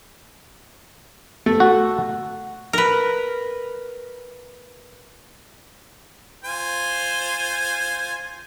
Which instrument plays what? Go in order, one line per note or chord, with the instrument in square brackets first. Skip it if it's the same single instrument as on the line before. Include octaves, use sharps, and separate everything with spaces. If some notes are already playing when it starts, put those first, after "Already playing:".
[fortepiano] A3
[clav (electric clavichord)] F#4
[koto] A#4 B4
[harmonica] F4 C5 G#5